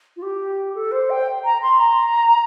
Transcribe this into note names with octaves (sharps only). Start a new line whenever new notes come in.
F4
G4
A4
C5
G5
A#5
C6
A#5